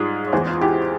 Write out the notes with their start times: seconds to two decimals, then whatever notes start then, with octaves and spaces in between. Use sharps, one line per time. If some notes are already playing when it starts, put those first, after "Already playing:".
Already playing: G#2 G3 F4 G#4
0.27 C#5
0.32 E2 E3 G#3 G#4 C5
0.47 F4
0.61 E4 G4